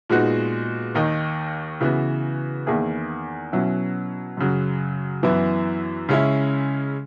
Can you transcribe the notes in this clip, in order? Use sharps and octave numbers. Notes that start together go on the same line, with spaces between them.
A#2 G#3 B3 D#4 F#4
D#2 D#3 A#3 D#4
C#3 E3 B3 F#4
E2 D#3 A#3 E4 G#4
B2 F#3 C#4 E4
F#2 C#3 F#3
F#2 E3 B3 E4
C#3 G#3 C#4 E4